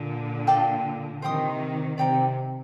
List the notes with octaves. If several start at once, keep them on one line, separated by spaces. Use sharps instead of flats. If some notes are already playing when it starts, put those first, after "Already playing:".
Already playing: A#2 D3
F4 A4 D5 G5
C3 D#3 C5 G5 C6 D#6
C3 D5 G5 A#5